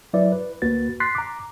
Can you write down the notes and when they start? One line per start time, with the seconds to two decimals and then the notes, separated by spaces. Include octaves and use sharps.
0.14 F#3 E4 B4 D5 E5
0.32 B4
0.62 D2 A#3 F#4 B4 A6
1.00 C6 F#6 A6 B6 C7
1.15 A#5 D6